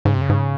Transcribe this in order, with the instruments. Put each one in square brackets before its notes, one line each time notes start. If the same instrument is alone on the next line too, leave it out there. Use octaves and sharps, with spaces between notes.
[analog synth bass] G#2 [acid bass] C#3
[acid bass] C3
[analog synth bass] F#2 [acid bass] C#3
[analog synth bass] G#2